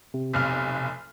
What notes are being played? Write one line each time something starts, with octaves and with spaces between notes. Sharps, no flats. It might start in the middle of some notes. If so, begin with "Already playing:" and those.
C3
F1 B1 F6